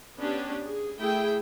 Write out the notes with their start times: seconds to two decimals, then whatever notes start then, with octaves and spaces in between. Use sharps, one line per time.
0.18 B3 C#4 D4 G4
0.64 G#4
0.99 A3 E4 G#4 G5